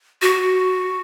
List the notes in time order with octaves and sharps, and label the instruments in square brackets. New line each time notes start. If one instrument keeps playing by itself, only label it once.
[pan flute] F#4